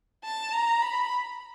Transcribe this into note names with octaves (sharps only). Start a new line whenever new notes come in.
A5
A#5
B5